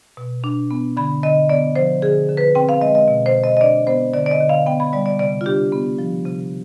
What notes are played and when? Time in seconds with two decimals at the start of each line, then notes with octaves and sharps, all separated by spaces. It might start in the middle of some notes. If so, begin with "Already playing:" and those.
0.17 B2
0.44 D4
0.71 B3
0.97 D3 B5
1.23 D3 D#5
1.49 B3 D5
1.75 F3 C5
2.02 D3 G#4
2.29 D3
2.37 B4
2.55 C4 G5
2.69 F5
2.81 G#3 D#5
2.95 D#5
3.08 B2
3.26 C5
3.35 B2
3.43 D#5
3.57 D#5
3.61 D4 D5
3.87 B3 C5
4.14 D3 D5
4.26 D5
4.31 D#5
4.40 D3
4.49 F5
4.66 B3 G5
4.80 B5
4.93 G3 D5
5.06 D5
5.19 C3 D5
5.41 F4
5.46 D4 G4
5.72 B3
5.99 F3
6.26 C3